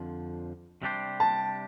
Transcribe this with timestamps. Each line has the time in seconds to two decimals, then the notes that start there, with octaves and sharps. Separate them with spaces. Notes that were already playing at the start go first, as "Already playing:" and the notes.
Already playing: F2 D3 F3
0.82 C3 G3 D4 G4 C5
1.20 A5